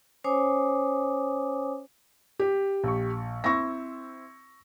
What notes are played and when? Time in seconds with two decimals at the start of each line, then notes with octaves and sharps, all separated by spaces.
0.24 C#4 C5 C#5 G#5 D6 D#6
2.39 G4
2.84 A#1 C#6
3.44 C4 E4 C#6 E6 A#6